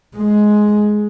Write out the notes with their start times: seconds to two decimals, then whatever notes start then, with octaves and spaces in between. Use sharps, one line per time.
0.17 G#3